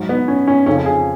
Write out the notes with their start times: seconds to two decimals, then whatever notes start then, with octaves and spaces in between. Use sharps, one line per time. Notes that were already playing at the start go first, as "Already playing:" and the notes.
Already playing: G#2 F#3
0.09 B3
0.28 C#4
0.47 C#4
0.66 F2 C#3 F3 C#4
0.86 G#4